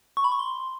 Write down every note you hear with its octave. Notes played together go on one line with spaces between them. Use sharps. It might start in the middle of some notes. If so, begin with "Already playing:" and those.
C#6
B5
C#6
C6